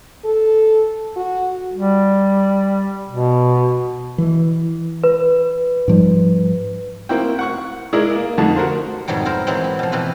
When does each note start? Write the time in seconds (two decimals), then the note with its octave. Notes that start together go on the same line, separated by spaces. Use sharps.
0.25 A4
1.16 F#4
1.73 G3
3.09 B2
4.18 E3
5.04 B4
5.88 G#2 F3 G3
7.09 A#3 C4 E4 F#4 G5
7.39 F#5 C#6 F#6
7.93 G#3 E4 G#4 A#4 D5 E5
8.16 A#3
8.38 F2 D3 G3 A3 D#4 A5
8.56 F#4 A#4 C5
9.08 F2 G#2 B2 F#3 G3
9.26 E4 A#4 C5
9.47 E3 F#3 G#3 C4
9.64 B5
9.79 B2 F3
9.92 B2 E3 C4 G4 B4